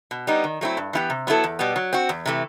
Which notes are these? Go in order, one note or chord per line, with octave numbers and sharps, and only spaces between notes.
B2
G3 B3 D#4
D#3
F#3 A3 C4 E4
G2
E3 B3 E4 G4
C3
F#3 B3 E4 A4
E2
B2 G3 B3
F#3
C4 F#4
E2
C3 E3 A3